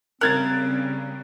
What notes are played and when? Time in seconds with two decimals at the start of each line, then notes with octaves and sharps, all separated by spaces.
0.21 C#3 G3 C4 A#4 F#6 G#6 A6